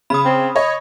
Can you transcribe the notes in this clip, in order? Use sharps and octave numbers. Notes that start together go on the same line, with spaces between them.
C#3 B5 D#6
C4
C#5 D#5